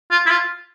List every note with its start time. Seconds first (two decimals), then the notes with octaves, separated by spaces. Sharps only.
0.11 F4
0.26 E4
0.30 F4